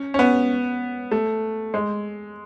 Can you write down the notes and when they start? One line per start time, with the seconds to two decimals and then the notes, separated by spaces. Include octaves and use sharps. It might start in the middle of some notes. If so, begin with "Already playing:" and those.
Already playing: C#4
0.14 C#4
0.19 B3
1.11 A3
1.74 G#3